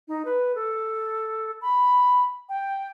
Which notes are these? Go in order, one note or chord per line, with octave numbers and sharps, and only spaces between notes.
D#4
B4
A4
B5
G5